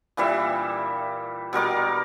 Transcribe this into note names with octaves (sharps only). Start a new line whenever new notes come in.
A#2 E3 G3 E5
B2 G3 A#4 D6